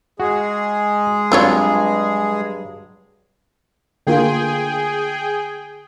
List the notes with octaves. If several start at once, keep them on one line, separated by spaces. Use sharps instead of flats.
G#3 F#4 G#4
G2 F#3 C4 D4 F4 C#5
D3 A#3 F4 G#4 G5